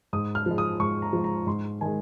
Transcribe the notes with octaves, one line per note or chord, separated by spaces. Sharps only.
G#2 D#6
F6
F3 G#3
D#6
G#2 C#6
A#5
F3 G#3
A#5
G#2 C6
D#3 G#3 G#5